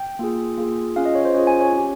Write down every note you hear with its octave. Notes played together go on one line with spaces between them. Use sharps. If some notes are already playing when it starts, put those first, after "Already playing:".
Already playing: G5
A#3 F4 G#4
A#3 F4 G#4
C#4 F4 G#4 F5
D#5
C#5
C5
C#4 F4 G#4 C#5
G#5
C#5
C#4 G4